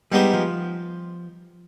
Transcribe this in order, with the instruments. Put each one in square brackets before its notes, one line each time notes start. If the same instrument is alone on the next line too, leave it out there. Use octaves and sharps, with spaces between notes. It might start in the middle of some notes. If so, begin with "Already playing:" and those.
[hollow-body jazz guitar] G3 [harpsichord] G#3 B3 D#4 G4 C5
[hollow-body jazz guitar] F3